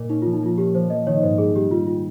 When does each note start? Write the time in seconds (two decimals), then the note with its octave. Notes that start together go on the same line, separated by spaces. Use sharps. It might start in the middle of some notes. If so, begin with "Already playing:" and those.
Already playing: A#2 A#3
0.10 C#4 D#4
0.22 F3 F4
0.33 D#4
0.42 A#3 F4
0.58 C#4 G4
0.75 F3 C5
0.90 A#3 D#5
1.06 D#3 C#5
1.23 G#2 C5
1.38 G3 G#4
1.55 G3 G4
1.71 G3 F4
1.87 F4